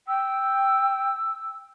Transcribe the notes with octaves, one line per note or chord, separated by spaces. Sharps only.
G5 E6